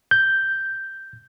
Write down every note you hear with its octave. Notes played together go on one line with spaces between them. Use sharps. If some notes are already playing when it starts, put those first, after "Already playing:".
G6